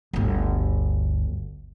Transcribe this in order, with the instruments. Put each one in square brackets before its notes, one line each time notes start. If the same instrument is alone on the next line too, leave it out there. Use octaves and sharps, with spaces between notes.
[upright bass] G1 D2